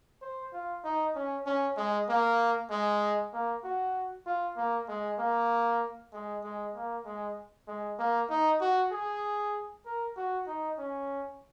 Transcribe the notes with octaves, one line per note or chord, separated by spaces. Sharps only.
C5
F4
D#4
C#4
C#4
G#3
A#3
G#3
A#3
F#4
F4
A#3
G#3
A#3
G#3
G#3
A#3
G#3
G#3
A#3
D#4
F#4
G#4
A#4
F#4
D#4
C#4